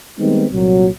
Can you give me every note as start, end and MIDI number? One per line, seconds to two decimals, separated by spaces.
0.19 0.46 51
0.19 0.46 55
0.19 0.46 56
0.19 0.46 59
0.19 0.46 60
0.19 0.46 63
0.51 0.89 36
0.51 0.89 46
0.51 0.89 54